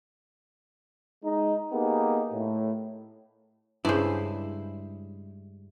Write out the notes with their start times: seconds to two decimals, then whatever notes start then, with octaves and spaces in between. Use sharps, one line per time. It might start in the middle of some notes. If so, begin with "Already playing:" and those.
1.23 G#3 D#4
1.72 A#3 B3 D#4 G4 G#4
2.32 A2
3.85 G2 C#3 G#3 E4 C5 D5